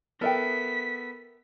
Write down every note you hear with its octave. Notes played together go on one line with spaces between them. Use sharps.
B3 A4 A#4 E5 G5 B6